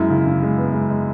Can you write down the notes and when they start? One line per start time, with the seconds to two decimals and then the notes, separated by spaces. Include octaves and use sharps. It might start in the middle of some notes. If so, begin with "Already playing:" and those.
Already playing: F#2 G#3 E4
0.10 C#3
0.26 C#3
0.42 G#3
0.58 B3
0.74 G#3
0.90 G#3